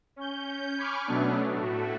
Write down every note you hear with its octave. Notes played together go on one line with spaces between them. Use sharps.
C#4 G6
G#5 B5 C#6 D6 F6
B2 F#3 A3 B3 C#4 D4
A2 A3 F#4